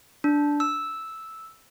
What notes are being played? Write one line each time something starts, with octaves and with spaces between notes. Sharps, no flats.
D4
E6